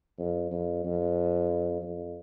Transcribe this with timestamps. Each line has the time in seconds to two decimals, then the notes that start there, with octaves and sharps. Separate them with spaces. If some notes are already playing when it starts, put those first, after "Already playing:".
0.19 F2
0.51 F2
0.84 F2
1.82 F2